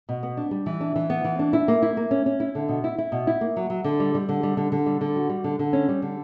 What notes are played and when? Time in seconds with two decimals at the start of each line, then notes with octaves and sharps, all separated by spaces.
0.09 B2
0.23 B3
0.37 D4
0.51 G3
0.66 E3
0.81 D4
0.96 E3
1.10 B3
1.24 E3
1.39 D4
1.53 E4
1.68 A#3
1.82 E4
1.97 A#3
2.11 C#4
2.26 C#4
2.40 E4
2.55 D3
2.69 B2
2.84 E4
2.98 E4
3.12 B2
3.27 E4
3.41 A#3
3.56 F#3
3.70 F#3
3.84 D3
4.00 G3
4.15 G3
4.29 D3
4.43 G3
4.57 D3
4.72 D3
4.86 G3
5.01 D3
5.16 F#4
5.29 G3
5.44 D3
5.59 D3
5.73 C#4
5.89 G3
6.02 D3